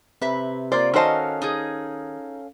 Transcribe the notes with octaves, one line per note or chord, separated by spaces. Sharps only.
C3 B4 E5
A#3 F4 C5 D5
D#3 C#4 F#4 A4 C5 D#5 F5 A5
D#4 G#4